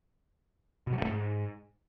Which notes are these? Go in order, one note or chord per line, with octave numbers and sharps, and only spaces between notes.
B2
F#3
G2
A3
G#2